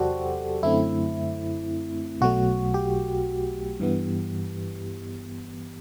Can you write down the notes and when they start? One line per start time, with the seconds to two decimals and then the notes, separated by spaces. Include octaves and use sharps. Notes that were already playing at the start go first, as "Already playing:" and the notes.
Already playing: E2 C3 F#3 F#4 G4 A4 C5 D5
0.63 F#2 D3 A3 C4 E4
2.21 B1 B2 F#3 A3 F#4
2.74 G4
3.80 G2 E3 B3